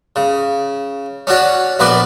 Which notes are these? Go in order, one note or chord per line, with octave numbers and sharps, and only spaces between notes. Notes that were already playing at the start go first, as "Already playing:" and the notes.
C#3
C#4 D4 F#4 C#5
A#1 B3 F#4 B4 D5